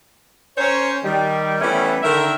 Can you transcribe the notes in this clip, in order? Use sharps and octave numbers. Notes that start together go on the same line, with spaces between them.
C#4 A#4 C5 C#5
D#3 G3
E3 G3 A3 B3 C#4 E4
D3 D#3 A#4 E5